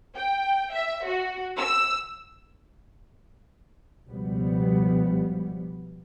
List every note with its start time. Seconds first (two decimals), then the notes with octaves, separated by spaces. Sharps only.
0.16 G5
0.74 E5
1.05 F#4
1.58 E6
4.07 C#2 B2 F3 G3 B3